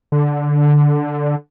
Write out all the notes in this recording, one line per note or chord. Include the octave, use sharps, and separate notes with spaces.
D3